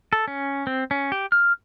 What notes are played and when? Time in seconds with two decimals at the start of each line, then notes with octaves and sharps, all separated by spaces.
0.13 A4
0.28 C#4
0.67 C4
0.91 C#4
1.12 G4
1.32 F6